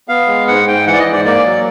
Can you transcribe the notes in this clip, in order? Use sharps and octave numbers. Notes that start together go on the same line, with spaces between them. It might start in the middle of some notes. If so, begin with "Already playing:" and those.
B3 F5
G#3
G#2 F#5
G#2 G5
E3 F#5
D5
D#5
G#2
D5
A#3 D5
F#3